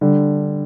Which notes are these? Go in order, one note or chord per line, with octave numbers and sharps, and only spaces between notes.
D3 G3